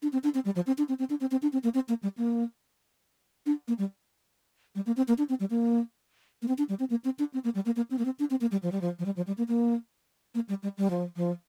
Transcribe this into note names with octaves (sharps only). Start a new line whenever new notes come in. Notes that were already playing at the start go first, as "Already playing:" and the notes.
D4
C4
D4
C4
G3
F3
C4
D4
C4
C4
D4
C4
C4
D4
C4
A#3
C4
A#3
G3
A#3
D4
A#3
G3
G3
A#3
C4
A#3
D4
C4
G3
A#3
A#3
C4
D4
G3
C4
A#3
C4
D4
C4
A#3
G3
A#3
A#3
C4
A#3
C4
D4
C4
A#3
G3
F3
G3
F3
F3
G3
F3
G3
A#3
A#3
A#3
G3
G3
G3
F3
F3